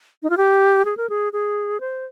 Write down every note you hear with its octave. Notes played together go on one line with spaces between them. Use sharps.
D#4
F4
G4
G#4
A#4
G#4
G#4
C5